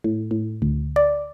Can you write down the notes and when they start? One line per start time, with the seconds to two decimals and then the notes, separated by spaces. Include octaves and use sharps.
0.04 A2
0.31 A2
0.62 D2
0.96 D5